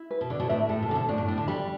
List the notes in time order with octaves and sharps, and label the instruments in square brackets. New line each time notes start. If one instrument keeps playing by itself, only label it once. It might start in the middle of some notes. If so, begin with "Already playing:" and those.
Already playing: [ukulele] E4
B4
[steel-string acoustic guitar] B2
[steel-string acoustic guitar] D3 [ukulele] D4
[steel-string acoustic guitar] B2
[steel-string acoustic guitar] A2 [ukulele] E5
[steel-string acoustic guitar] A2 [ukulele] A4
[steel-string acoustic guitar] B2
[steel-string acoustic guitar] D3 [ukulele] A5
[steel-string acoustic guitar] B2
[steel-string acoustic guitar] A2 [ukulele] D4
[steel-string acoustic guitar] G2
[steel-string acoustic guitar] A2 [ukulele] D4
[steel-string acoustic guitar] D3
[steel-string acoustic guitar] G3 [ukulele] B5